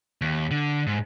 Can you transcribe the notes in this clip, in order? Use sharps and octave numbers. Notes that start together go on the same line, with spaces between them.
D#2
D3
G#2